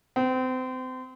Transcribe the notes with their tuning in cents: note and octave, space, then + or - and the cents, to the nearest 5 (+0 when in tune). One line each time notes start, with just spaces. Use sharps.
C4 -30